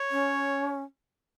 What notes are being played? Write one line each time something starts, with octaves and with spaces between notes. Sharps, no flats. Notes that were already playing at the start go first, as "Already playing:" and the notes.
Already playing: C#5
C#4